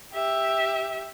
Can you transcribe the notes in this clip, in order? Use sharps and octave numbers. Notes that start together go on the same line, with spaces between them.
G4 E5